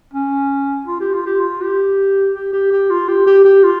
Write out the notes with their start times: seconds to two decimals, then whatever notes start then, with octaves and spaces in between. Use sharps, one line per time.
0.13 C#4
0.87 F4
1.00 G4
1.13 F4
1.26 G4
1.40 F4
1.61 G4
2.34 G4
2.53 G4
2.72 G4
2.90 F4
3.08 G4
3.27 G4
3.45 G4
3.63 F4